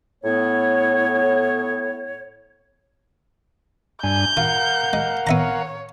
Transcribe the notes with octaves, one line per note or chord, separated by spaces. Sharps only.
A2 B3 C#5
G2 D4 G#5 G6
F4 A#4 F5 F#5
G#3
B3 C#5 E5 A#5